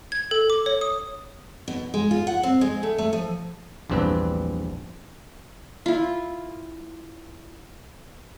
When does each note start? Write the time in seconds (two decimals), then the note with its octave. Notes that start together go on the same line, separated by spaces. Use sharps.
0.12 G#6
0.31 A4
0.50 D6
0.66 C#5
0.81 D#6
1.68 B2
1.94 G#3
2.11 F4
2.27 F#5
2.43 C4
2.61 G#3
2.83 A3
2.98 A3
3.13 F3
3.90 A#1 E2 G2 C4 D4 B4
5.86 E4 F4